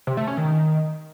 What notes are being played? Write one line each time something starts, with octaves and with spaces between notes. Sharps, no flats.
C3
A3
C#4
D#3